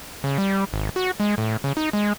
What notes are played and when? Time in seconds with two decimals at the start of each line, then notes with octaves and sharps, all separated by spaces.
0.24 C#3
0.38 G3
0.73 G#1
0.96 F#4
1.20 G#3
1.38 A2
1.64 C#3
1.77 D#4
1.93 G#3